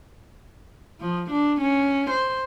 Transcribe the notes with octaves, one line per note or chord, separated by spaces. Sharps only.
F3
D4
C#4
C5